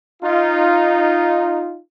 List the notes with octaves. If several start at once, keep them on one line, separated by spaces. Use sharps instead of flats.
D#4 F4